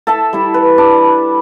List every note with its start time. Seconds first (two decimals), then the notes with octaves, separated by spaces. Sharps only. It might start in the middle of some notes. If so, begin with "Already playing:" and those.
0.07 A4 E5 A5
0.33 G3 E4
0.54 B4
0.78 D4